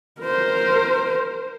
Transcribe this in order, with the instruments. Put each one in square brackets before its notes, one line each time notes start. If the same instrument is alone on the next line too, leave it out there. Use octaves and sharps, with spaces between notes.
[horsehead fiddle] A#4 C5